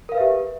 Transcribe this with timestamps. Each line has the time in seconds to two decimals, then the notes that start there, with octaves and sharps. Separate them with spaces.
0.09 A#4
0.12 F5
0.15 B4
0.18 E5
0.20 G4